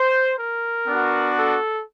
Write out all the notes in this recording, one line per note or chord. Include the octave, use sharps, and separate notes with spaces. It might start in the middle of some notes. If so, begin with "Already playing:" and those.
Already playing: C5
A#4
B3 D4 F#4
A4